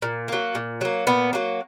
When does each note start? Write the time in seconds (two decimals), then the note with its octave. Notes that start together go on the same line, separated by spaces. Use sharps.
0.02 A#2
0.28 F#3 A#3
0.55 A#2
0.81 F#3 A#3
1.07 A#2 B3
1.33 F#3 A#3